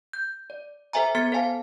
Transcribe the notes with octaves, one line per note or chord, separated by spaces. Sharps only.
G6
D5
A4 C5 E5 G#5 A#5
B3 A4 A6 C#7
A4 C5 F5 G#5 A5